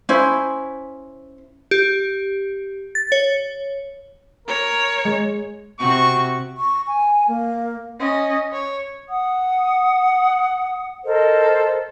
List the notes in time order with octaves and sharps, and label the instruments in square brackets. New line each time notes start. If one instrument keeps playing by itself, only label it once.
[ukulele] C#4 E4 C5
[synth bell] G4
A6
C#5
[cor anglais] A#4 [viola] C#5
[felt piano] G#3
[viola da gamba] C3 F#4 [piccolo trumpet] C#6
[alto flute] C#6
G#5
A#3
[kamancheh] C#4 D#5
C#5
[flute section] F#5 D#6
A4 A#4 C5 D#5